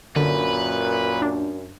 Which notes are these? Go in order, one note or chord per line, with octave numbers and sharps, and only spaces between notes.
F#2 A#2 D3 B4
D4